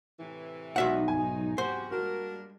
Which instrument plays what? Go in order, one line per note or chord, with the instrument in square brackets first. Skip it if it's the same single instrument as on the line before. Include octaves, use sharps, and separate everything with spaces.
[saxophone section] A2 C3 E3
[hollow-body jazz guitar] B1 E5 F#5 [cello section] G#3 D4 D#4 [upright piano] F#4
[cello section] G#2 F#3 D#4 [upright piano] G#5
[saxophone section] E2 C3 F#4 [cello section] G4 [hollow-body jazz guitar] C5
[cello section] G3 G#3 [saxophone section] A#3 D4 A#4 [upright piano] F#4